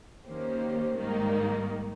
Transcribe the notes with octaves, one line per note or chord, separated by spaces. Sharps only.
D#3 A#3 C#4 G4 C5
G#2 D#3 G3 A#3 D#4